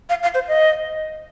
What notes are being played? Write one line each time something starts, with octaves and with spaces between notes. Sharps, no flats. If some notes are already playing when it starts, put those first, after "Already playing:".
F5
F5
C5
D#5